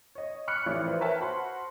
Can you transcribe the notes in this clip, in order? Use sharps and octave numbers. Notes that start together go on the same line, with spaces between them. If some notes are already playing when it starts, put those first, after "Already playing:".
C#5 D#5
B5 C#6 D6 F6 F#6 C#7
A1 A2 E3 F3 D5 D6
B4 C5
A#4 B4 C#5 E5 G5 A5
F#4 C5 F#5 A5 B5 C6